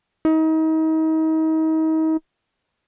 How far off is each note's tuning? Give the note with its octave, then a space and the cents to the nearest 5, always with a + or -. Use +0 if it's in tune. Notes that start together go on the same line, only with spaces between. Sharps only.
D#4 +35